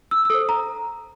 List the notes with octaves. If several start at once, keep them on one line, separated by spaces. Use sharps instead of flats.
E6
E6
A4 C5 D#6
A#5